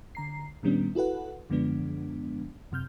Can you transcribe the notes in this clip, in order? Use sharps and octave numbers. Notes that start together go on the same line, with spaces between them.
D3 A#5 C7
A#2 D#3 G3 B3 C#4 D4
E4 F#4 A4 B4 F#5
F#2 D3 F3 G#3 B3 D4
F#2 C3 F6 G6